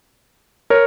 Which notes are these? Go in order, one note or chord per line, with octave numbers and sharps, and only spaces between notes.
A#4 C#5